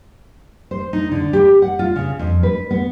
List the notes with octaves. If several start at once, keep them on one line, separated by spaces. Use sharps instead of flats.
C5
D#4
D3
G4
F#5
F4
C#3
F2
B4
B3